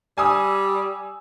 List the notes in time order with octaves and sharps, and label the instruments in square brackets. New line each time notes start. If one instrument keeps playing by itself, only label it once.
[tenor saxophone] G3 [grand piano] G#5 D#6 E6